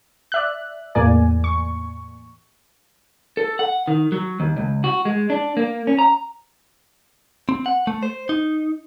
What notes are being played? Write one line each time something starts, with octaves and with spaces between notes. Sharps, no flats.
D5 E5 F#6
E2 A2 A#3 D5 G#5
C#6
A4
F#5
D#3
F#3
D#2
C#2
F#4
G#3
D4
A#3
C#4
A#5
C4
F#5
A3
C5
D#4